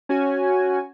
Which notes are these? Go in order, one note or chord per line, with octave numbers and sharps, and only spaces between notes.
C#4 F#4 G#5